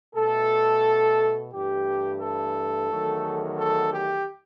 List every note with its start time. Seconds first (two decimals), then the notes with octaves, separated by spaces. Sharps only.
0.15 B2 A3 A4
1.52 G2 E3 A3 G4
2.21 A4
2.89 E2 D#3 F#3 A3
3.58 A4
3.92 G4